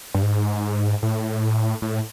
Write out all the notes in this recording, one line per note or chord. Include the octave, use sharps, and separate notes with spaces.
G2
G#2
A2
A2